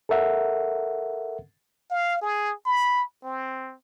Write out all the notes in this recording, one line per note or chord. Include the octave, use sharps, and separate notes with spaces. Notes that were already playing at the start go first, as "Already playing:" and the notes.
A4 A#4 E5 F#5
F5
G#4
B5
C4